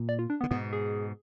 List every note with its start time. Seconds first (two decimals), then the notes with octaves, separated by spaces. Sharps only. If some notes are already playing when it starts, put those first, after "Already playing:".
Already playing: A#2
0.09 D5
0.19 F4
0.30 D4
0.41 B3
0.43 D3
0.51 G#2 B2 B3
0.73 G#4